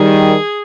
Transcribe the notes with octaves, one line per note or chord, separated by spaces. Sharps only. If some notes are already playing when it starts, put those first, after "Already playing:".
Already playing: D#3 G3 G#4